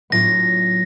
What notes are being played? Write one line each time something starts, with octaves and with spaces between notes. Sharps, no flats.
A2 F#3 B3 D4 F4 A#6